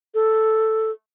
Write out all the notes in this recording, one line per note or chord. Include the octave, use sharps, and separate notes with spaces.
A4